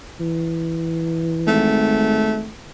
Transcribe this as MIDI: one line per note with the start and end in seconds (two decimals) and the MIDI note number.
0.20 1.76 52
1.47 2.48 32
1.47 2.49 57